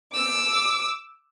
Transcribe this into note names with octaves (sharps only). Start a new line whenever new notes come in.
D6 E6